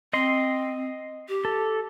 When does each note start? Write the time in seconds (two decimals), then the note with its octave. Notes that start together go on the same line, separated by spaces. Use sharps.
0.13 C4 D#5 C6
1.29 G4
1.45 A4